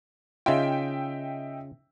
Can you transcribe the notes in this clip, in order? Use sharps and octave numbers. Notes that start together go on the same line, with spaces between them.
C#3 D#4 F4 E5 G5